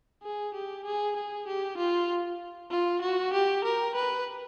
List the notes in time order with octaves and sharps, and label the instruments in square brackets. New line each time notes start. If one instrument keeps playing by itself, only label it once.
[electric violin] G#4
G4
G#4
G#4
G4
F4
F4
F#4
G4
A#4
B4